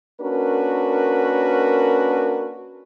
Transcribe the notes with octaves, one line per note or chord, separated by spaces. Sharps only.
A#3 C#4 D4 F#4 A#4 B4